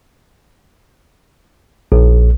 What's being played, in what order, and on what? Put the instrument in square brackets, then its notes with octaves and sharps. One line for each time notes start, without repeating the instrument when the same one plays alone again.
[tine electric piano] A#1